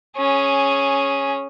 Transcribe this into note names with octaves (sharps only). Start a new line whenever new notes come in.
C#4 G#4